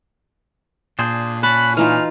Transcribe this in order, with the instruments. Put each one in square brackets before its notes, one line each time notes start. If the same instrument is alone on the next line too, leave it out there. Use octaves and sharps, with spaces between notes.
[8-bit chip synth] A#2 [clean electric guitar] D4 G#4 C5
[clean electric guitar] C#4 [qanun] A5 [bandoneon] B5 F#6
[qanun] E3 D#4 F4 [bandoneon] F6